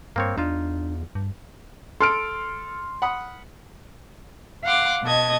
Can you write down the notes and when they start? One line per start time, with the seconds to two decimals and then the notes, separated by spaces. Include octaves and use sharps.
0.16 G2 A#3 C4 C#5
0.38 E2 D4 D#4 F4
1.15 G2
2.01 A4 C6 F6 D7
3.02 F#5 B5 D#6
4.64 F5 F#5 C6 D6
5.04 B2 D#5 A5 G#6